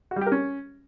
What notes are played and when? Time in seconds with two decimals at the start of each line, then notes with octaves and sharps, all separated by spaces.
0.11 F#4
0.16 G3
0.21 G4
0.27 A#4
0.32 C#4